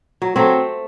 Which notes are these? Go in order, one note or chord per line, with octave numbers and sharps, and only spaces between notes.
F#3
F#3 A3 C4